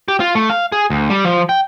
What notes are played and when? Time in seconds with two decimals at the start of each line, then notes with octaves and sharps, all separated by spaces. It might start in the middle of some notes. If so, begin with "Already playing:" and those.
0.08 G4
0.20 F4
0.35 A3
0.50 F5
0.72 G#4
0.90 D2
1.10 G3
1.25 F3
1.49 G5